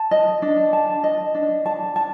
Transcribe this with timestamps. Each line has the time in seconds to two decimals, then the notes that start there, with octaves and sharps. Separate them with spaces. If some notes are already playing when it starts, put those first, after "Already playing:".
Already playing: A5
0.11 D#5
0.42 D4
0.73 A5
1.04 D#5
1.35 D4
1.66 A5
1.96 A5